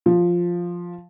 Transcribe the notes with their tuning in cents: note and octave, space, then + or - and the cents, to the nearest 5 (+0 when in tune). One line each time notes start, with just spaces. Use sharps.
F3 +0